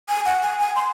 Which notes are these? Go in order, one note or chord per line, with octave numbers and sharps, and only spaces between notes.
G#5
F#5
G#5
G#5
C6